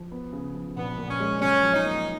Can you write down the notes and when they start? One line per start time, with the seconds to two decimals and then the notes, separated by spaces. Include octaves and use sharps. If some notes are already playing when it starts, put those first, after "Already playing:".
Already playing: F3
0.12 B3
0.33 C#3
0.55 F3
0.76 A#1 B3
0.98 A#2
1.09 C#4
1.20 G#3
1.41 F#2 C#4
1.63 F3
1.74 D#4
1.85 A#3